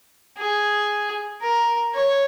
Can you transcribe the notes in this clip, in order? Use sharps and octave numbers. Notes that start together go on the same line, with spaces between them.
G#4
A#4
C#5